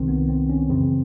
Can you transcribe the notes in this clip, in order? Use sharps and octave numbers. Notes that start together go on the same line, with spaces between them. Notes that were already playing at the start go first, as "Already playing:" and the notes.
Already playing: C2 C3 D#3 C4
B3
C4
C#4
F#2 C#3 E3 C4